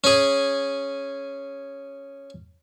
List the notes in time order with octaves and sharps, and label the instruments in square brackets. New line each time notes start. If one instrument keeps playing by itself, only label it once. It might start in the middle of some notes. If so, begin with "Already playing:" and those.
[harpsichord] C#4 G#4